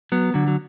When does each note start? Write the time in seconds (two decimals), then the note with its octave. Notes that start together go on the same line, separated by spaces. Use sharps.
0.12 F#3 B3
0.34 D3 F#3
0.48 F#3